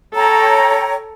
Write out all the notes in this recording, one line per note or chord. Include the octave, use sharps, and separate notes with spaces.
A4 C#5 G5 A#5